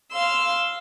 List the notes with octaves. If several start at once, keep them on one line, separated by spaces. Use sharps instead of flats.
F5 C6 E6